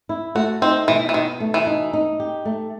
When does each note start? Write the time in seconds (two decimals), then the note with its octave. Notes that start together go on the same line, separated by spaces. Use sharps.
0.09 E4
0.35 A3 F#4
0.62 C4 D#4
0.88 B2 E3
1.09 E3
1.14 B2 D#3
1.40 A3
1.54 E3
1.67 D#4
1.93 D#4
2.20 G4
2.45 A3